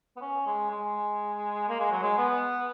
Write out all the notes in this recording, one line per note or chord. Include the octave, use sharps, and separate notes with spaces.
B3
C#4
G#3
G#3
A#3
G#3
F#3
G#3
B3